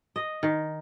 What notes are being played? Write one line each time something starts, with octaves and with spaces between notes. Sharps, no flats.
D#5
D#3